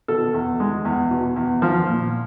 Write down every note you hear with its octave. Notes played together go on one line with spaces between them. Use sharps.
B2 A4
E2
G#3
E2
B2
E2
F3
A#2